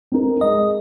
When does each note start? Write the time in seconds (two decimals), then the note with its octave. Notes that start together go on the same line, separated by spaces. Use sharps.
0.12 C4 D#4 A#4
0.41 G#3 D#5